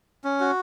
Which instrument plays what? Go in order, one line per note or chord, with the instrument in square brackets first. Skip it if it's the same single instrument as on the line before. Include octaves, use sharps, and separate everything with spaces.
[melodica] C#4
F#4